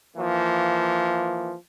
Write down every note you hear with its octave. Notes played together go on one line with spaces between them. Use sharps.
E3 F3 A#3